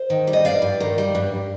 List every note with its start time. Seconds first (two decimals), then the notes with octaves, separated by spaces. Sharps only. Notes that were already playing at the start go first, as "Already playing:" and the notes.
Already playing: C5
0.10 D#3
0.27 G3
0.33 D#5
0.45 G2 D5 F5
0.62 G2
0.80 D#3
0.98 G3
1.15 G2